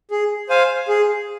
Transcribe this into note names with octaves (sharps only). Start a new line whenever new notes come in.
G#4
C5 F5 G#5
G#4